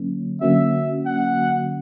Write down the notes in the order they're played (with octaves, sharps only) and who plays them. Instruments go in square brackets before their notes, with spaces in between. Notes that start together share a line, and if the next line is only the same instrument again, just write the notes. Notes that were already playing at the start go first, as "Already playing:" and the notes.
Already playing: [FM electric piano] D3 F#3 A#3 C#4
[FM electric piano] D3 F#3 A#3 C#4 F#4 [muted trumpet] E5
[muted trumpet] F#5